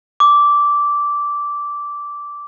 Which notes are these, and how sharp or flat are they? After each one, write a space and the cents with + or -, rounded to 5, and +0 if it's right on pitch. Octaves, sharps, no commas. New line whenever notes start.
D6 -10